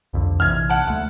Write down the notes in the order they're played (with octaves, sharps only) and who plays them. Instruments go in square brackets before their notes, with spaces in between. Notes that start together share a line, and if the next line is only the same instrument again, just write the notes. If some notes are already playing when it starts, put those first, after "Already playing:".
[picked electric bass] C2 F2 D3
[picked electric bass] A#1 C3 E3 [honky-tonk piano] F6 G#6
[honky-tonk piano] F#5 A5
[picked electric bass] D2 A3